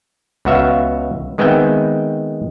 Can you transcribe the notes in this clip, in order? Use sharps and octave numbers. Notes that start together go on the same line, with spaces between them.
C#2 B3 F#4 E5 F5
D#3 G#3 B3 C4 E5 G5